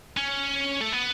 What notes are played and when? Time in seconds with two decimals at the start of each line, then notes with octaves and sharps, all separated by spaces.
0.17 C#4
0.80 A3
0.92 B3